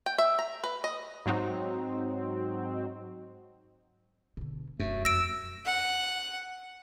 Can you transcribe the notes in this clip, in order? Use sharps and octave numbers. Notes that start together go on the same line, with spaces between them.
G5
E5
A#5
B4
D#5
G#2 F#3 C4 D#4 F#4
B2 D3
E1 F#2 A3
F2 E6 A#6 D7
F#5